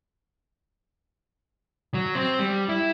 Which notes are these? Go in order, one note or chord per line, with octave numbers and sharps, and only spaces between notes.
F#3
C4
G3
E4